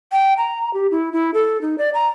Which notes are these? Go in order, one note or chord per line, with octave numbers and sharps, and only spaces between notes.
G5
A#5
G4
E4
E4
A4
D#4
D5
A#5